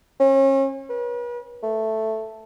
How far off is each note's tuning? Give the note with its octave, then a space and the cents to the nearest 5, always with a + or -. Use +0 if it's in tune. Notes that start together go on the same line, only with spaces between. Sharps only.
C#4 -40
B4 -40
A3 +0